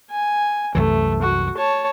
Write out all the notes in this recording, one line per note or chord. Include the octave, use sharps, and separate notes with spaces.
G#5
C2 F#2 E3 A3
F#4
C#5 A5